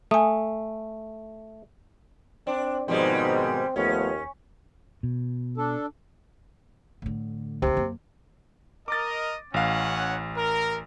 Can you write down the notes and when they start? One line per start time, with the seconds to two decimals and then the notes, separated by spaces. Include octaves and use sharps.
0.11 A3 G#5 D#6
2.47 C4 D4
2.88 G#2 B2 D#3 F3 G3 G#3 C4
3.76 D#2 F3 A3 B3 C#4
5.03 B2
5.57 D4 A4
7.02 A2 D3
7.62 C#2 C3 D#4
7.77 F#2 A#3
8.88 A#4 D#5 D6 A6
9.54 A1 C#4 C#5 F5 F#5
10.37 A#4